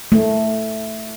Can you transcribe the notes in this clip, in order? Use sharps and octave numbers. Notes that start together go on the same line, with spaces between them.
A3